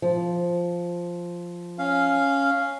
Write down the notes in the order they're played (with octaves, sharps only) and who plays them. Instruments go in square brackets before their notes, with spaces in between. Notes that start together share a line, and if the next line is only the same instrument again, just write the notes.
[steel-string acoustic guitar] F3
[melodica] C#4 F5